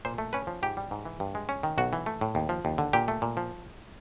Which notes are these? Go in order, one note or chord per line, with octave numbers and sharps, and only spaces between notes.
A#2 C5
A3
C#4 B4
F3
G#2 G4
G3
G#2
E3
G2
G#3
C#4
D#3
B1 F#4
E3
A3
A2
D#2
F3
D#2
D3
A#2 G4
A3
A#2
F3